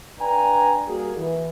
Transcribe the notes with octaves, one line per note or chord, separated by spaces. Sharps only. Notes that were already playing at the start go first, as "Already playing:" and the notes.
D4 B4 G5 G#5 A#5
G3 A#3 F#4 G#4
E3